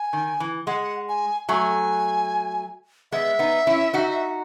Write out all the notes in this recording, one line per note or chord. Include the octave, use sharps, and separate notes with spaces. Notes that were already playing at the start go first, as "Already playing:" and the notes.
Already playing: G#5
D#3
E3
G#3 F#5
G#5
F#3 A3 G#5
G#3 B3 E5
B3 D#4
C#4 E4
D#4 F#4